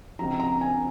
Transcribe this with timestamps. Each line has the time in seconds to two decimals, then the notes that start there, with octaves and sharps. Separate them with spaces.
0.19 C#2 C3 F3 A#5
0.40 A#5
0.61 G#5